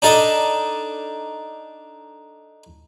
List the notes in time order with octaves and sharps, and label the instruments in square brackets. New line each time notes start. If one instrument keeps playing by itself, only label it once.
[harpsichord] D4 D#4 A4 D#5